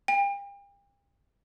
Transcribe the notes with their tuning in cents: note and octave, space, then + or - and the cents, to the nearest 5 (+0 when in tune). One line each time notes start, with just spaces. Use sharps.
G5 +40